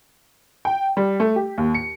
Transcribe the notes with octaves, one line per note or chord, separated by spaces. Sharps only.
G5
G3
A3
G4
D#2
C#7